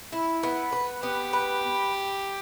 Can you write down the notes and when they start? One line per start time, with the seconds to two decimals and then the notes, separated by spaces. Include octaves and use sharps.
0.12 E4
0.43 B3
0.72 B4
1.02 B3 G4
1.33 B4